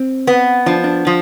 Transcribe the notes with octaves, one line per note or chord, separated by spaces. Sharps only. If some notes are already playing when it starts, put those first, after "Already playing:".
Already playing: C4
B3
F3 D4
D4
F3